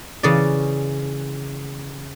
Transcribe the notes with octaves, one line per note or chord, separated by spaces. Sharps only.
C#3 E3 C#4 D5